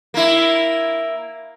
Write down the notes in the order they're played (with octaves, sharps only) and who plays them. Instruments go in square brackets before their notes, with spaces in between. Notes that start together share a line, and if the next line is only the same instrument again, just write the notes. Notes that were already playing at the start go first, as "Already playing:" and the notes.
[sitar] A#3 E4